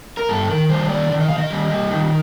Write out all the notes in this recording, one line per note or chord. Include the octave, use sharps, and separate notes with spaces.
A#4
G2 A4
D#3 A#4
G3 C5
D#3 D5
D#3
D#5
D#3 F5
D#5
G3
G3
D#3